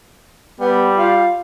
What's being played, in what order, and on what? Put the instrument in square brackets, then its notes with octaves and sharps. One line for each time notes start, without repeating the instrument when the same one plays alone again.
[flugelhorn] G3 [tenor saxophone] B3
[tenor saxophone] F4